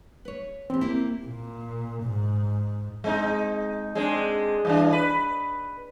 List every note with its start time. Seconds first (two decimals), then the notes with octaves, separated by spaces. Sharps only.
0.25 B4 C#5
0.70 E2 C4 G4
0.81 A#3 E4 G4
1.25 A#2
2.03 G#2
3.04 G#3 C4 D#4
3.95 G#3 C4 D4
4.65 G2 E3 D4
4.93 B4